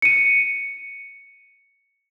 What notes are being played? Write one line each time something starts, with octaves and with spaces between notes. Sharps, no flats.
C#7 D#7